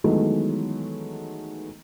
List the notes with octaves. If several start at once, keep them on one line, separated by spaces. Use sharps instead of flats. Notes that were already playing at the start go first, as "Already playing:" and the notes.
D#3 E3 F#3 G#3 A3 B3